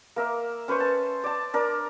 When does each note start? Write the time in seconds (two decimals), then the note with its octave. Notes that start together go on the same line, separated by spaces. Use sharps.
0.16 A#3 A#4 E5
0.68 C#4 B4 C5 C#6
0.80 A5
1.24 D5 A5
1.54 D4 A#4 D5